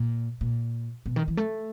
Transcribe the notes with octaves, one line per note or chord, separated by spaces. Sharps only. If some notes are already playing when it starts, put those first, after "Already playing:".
Already playing: A#2
A#2
B2
D#3
E3
A3